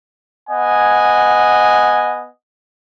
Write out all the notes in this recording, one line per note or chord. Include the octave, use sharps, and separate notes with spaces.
B3 D#5 F#5 G#5